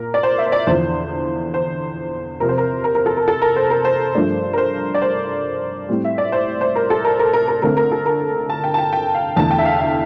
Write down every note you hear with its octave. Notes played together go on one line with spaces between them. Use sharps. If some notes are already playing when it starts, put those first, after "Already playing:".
Already playing: A#2 A#4
D5
C5
E5
C5
D5
E2 D3 F3 C5
C5
C3 F3 C4 A#4
C5
A#4
A#4
A#4
A4
A#4
A4
A#4
C5
A#4
C5
G2 F3 A3 D4
A#4
C5
D5
C5
A2 G3 C4
E5
D5
C5
C5
A#4
A4
A#4
A#4
A#4
A#4
D3 A3 C4 A#4
A#4
A4
A#4
A5
G5
A5
G5
G5
F5
E2 D3 A3 A5
G5
E5
F5
E5